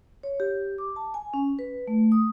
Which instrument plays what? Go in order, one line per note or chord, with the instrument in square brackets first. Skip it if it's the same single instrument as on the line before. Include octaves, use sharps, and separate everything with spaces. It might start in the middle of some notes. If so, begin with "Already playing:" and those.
[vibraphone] C#5
G4
D6
A5
G#5
C#4
B4
A3
D#6